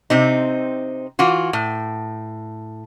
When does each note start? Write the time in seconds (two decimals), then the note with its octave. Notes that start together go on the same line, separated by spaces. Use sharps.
0.10 C3 C4 D#4
1.19 E3 F4 F#4
1.53 A2